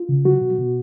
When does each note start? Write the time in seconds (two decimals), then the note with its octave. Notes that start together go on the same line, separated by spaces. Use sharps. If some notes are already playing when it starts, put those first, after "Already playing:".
Already playing: F4
0.09 C#3
0.25 F#3 F#4
0.41 B2
0.59 B2